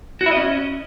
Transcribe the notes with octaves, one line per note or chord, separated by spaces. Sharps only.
F#4
E4
D#5
C#4